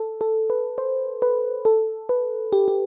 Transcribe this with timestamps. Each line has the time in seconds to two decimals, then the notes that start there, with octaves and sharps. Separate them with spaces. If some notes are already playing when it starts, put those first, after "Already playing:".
Already playing: A4
0.21 A4
0.50 B4
0.78 C5
1.22 B4
1.65 A4
2.09 B4
2.53 G4
2.68 G4